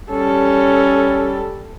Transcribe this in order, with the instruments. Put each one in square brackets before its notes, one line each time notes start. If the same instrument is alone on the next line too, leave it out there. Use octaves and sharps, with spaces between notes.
[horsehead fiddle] G3 A4 [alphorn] C#4